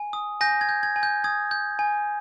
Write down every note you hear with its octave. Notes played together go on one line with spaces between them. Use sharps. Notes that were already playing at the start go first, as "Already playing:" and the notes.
Already playing: G#5
D#6
G#5 G6 A#6
G#6
G6
G#6
G#5
G6
D#6 G#6
G6
G#5